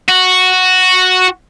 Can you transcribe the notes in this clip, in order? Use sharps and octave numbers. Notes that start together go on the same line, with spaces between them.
F#4